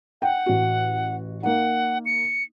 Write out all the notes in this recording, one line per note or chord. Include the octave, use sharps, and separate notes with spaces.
F#5 G5
A1 F#4
A#3 D#4 F#5
C#7